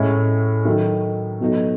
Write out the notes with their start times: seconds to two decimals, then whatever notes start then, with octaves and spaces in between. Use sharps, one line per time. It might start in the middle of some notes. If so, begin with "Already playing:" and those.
Already playing: A2 G#3 C#4 E4
0.65 D#3 F#3 A3 D#4
1.40 B2 F#3 A3 D#4